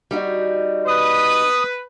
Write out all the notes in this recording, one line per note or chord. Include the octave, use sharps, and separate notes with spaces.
G3 D#4 F#4
B4 D#6